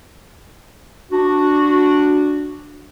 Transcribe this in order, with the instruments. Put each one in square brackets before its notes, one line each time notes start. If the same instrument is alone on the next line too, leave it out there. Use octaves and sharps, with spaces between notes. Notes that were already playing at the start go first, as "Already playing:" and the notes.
[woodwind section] D4 F#4